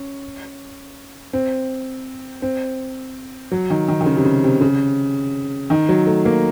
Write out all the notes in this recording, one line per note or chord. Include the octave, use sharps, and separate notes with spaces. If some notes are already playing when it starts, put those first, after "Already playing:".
Already playing: C#4
C4
C4
F#3
D#3
D#3
D#3
C#3
C3
C#3
C3
C#3
D#3
F#3
A3
A#3